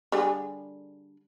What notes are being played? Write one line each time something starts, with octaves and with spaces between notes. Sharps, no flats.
D3 G3 G#4